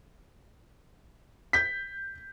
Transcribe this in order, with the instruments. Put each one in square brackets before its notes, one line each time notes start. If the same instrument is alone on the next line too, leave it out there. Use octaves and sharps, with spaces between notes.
[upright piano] G6 B6